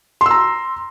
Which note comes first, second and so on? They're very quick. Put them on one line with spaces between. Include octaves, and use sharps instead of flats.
C6 E6 A#5